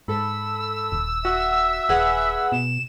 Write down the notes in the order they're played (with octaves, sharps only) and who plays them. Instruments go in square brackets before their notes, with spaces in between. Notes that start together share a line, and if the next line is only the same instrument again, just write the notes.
[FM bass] G#2 [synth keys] A4 B5 [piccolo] E6
[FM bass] D#1
[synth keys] F#4 [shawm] E5
[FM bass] D#1 [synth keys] G#4 B4 F#5
[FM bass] B2 [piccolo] E7